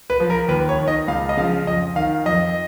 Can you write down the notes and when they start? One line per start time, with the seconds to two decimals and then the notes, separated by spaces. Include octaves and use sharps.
0.10 B4
0.20 F3
0.30 A#4
0.48 D#2 B4
0.69 C#5
0.78 D#3
0.88 D#5
1.08 C#2 F5
1.29 D#5
1.37 C#3 F3 F5
1.67 F2 D#5
1.96 D#3 F5
2.26 F2 D#5